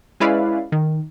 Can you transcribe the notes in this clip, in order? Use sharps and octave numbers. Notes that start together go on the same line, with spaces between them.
G#3 C#4 E4 B4 D5 F5
D#3